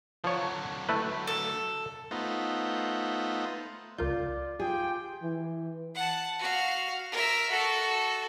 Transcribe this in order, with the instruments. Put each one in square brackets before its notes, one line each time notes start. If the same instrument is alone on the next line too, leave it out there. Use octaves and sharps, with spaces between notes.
[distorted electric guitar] D3 F#3 [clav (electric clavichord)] F3 C#5
[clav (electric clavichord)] A3 E4 B4
[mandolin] A4
[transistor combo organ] A3 B3 D#4 F4 C5
[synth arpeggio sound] C#2 A#4 G6 [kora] F4 [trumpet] D5
[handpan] F4 G4 [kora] G#4 [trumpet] G5
[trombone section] E3
[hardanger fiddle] F#5 A5
F#4 F5
A#4 E5
F#4 A4